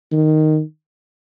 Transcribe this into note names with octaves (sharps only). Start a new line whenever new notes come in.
D#3